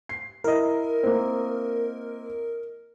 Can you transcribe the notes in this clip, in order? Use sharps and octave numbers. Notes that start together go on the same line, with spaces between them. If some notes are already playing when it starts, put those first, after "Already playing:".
C7
E4 A#4 D#5
A#3 C4